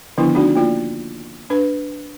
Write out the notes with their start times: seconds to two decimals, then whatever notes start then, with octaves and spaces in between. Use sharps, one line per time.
0.18 D3 D#3 F3 B3 D4 E4
0.35 A3 D4 D#4 F#4 D5
0.55 A#3 F4 D5
1.50 D4 B4